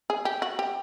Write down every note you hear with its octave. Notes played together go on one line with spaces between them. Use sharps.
G#4
G4
F#4
G4